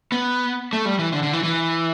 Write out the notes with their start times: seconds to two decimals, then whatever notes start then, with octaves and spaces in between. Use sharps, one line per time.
0.12 B3
0.73 A3
0.85 G3
0.99 E3
1.13 D3
1.23 D3
1.33 E3
1.43 E3